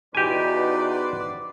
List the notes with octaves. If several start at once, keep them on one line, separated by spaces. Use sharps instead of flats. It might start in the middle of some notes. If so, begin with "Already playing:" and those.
E2 D#4 F#4 G4 B4 C5 D5 G#5